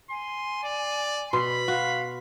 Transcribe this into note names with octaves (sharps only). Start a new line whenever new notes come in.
G#5 C6
D5
B2 B5 C6 C7
F#4 F5